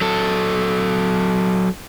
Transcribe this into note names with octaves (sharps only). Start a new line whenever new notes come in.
F#3 A4